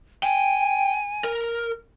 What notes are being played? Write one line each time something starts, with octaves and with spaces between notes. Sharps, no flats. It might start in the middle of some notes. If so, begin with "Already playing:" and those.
G5 G#5
A#4